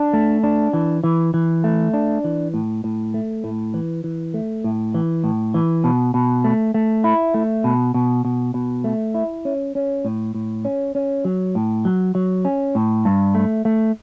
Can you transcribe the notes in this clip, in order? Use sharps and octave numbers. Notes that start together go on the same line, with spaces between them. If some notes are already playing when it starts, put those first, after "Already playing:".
Already playing: D4
A3
D4
E3
E3
E3
A3
D4
E3
A2
A2
A3
A2
E3
E3
A3
A2
E3
A2
E3
B2
B2
A3
A3
E4
A3
B2
B2
B2
B2
A3
E4
C#4
C#4
A2
A2
C#4
C#4
F#3
A2
F#3
F#3
C#4
A2
G2
A3
A3